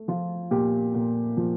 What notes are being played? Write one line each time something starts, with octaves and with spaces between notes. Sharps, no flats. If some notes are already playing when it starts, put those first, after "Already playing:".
Already playing: A3
F3 F4
A#2 G4
A#2
F3